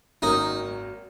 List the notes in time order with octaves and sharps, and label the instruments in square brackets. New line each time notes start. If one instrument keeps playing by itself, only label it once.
[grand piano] G#1 F#2 D#3 F#3 A#3 [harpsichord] D#4